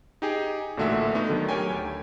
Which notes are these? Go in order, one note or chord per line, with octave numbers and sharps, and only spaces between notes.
D#4 G4 G#4
A1 A#2 D3 A3 F#4 E5
A3 B3 D#4
D3 D#3 F#3
G4 A#4 C#5 G5 G#5
D2